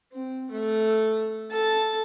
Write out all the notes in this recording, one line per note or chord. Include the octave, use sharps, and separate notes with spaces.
C4
A3
A4 A5